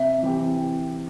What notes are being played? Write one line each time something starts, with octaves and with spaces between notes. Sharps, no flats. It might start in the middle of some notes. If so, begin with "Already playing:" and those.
Already playing: C3 E5
E3 C4 G4